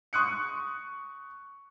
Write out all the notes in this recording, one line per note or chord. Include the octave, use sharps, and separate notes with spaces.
C#6 D#6 F#6 C#7